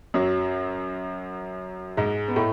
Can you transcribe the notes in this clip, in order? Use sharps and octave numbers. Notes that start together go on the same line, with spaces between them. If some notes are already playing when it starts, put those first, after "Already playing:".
F#2 F#3
G#2 G#3
B3
A2 A3